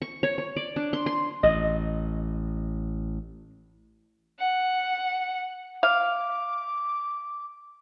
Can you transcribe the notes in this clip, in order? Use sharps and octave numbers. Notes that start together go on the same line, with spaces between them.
C#6
C#5
C#5
D5
D4
C6
C6
A1 D#5
F#5
F5 D6